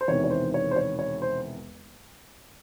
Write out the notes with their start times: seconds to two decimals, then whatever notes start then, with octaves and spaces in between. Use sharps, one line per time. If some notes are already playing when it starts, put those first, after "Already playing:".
0.01 C5
0.08 E1 E2 C3 D#3 C#5
0.24 C#5
0.31 C5
0.54 C#5
0.71 C5
0.76 C#5
0.99 C#5
1.22 C5